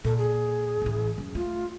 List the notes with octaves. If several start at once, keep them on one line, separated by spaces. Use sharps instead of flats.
A#2 A4
G#4
A1 E3
F#2
A3 F4